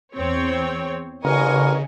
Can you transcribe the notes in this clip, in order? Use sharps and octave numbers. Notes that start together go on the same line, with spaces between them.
E2 C4 C#5
A1 G2 C#3 A#4 D#5 G#5 C#6